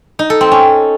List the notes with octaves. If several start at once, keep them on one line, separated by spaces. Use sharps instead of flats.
D#4
A4
C4
C#4